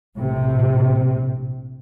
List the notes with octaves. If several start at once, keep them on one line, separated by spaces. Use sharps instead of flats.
A#1 A2 C3